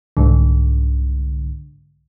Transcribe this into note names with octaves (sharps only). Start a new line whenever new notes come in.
C2 G#2 D3